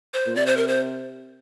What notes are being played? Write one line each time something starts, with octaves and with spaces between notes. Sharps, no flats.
C5
A#2
C3 D5
C5
A#4
C5